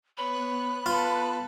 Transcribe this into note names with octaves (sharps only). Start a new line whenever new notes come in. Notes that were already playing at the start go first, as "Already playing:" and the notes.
B3 B4 C#5 B5 F#6
F4 A4 B4